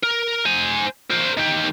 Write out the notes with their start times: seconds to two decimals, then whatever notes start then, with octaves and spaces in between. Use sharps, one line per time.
0.03 A#4
0.45 C5 G#5
1.10 A#4 C5
1.37 D#3 G4